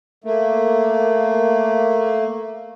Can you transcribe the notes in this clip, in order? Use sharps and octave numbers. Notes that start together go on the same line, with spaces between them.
A3 A#3